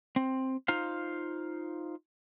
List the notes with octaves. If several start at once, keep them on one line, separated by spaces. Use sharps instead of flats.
C4
D#4 F4 C5 F5